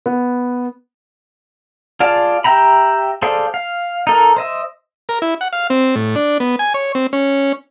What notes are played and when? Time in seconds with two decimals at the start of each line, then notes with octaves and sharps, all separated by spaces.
0.06 B3
2.00 F4 G#4 D5 F5 A5
2.44 G4 E5 G5 A#5 B5
3.22 G#4 A4 C5 D5 F5
3.54 F5
4.07 D#4 A4 A#4
4.37 C5 D#5 E5
5.09 A#4
5.22 E4
5.41 F#5
5.53 F5
5.70 C4
5.96 A2
6.16 D4
6.40 B3
6.59 G#5
6.74 C#5
6.95 C4
7.13 C#4